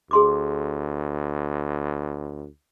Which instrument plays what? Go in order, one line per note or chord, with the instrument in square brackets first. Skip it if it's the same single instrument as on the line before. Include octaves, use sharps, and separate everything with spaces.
[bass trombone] D2 [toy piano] G#4 C6 D6